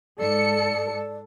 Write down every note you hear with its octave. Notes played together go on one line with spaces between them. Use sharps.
G#2 A4 D5 C#7